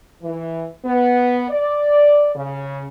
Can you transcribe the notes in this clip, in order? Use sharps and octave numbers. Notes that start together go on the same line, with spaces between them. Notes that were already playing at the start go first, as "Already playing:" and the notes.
E3
B3
D5
C#3